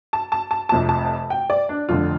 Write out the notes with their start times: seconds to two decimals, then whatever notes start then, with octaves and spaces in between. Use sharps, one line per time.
0.13 A5
0.32 A5
0.51 A5
0.69 F1 F2 C3 F3 A5
0.89 A5
1.30 G5
1.50 D5
1.69 D4
1.89 F1 F2 D3 F4